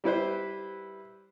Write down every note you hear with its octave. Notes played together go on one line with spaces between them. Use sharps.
G3 E4 B4 C5